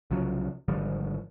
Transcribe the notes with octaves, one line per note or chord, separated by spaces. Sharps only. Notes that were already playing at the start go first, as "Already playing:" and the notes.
C2 C#3 F3 F#3
G#1 D3 F3 G3